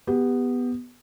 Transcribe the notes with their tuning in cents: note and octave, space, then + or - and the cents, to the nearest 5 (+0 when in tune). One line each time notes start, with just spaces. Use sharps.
B3 +0 G4 +20